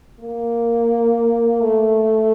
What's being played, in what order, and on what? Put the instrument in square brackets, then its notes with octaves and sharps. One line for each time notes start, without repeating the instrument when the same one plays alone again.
[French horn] A#3
A3